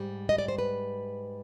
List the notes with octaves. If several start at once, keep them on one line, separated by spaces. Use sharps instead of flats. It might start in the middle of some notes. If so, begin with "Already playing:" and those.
Already playing: G#2 G3
D#5
D5
C5
B4